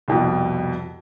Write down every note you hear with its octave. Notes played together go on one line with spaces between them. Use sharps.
C2 F2 B2